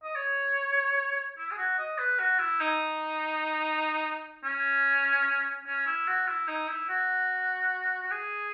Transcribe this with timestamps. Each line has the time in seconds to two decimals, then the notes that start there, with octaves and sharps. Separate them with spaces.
0.04 D#5
0.15 C#5
1.38 E4
1.51 G#4
1.58 F#4
1.78 D#5
1.99 B4
2.19 F#4
2.39 E4
2.61 D#4
4.44 C#4
5.67 C#4
5.86 E4
6.08 F#4
6.27 E4
6.48 D#4
6.68 E4
6.89 F#4
8.03 F#4
8.11 G#4